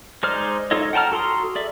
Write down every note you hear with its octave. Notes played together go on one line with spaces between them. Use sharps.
G#3 D#4 C5 D5 F6
D#4 F4 A4 C#5 D#5
F#5 G5 A5 A#5 F6
F#4 A4 A#5 C6 D#6
G#4 D5 E5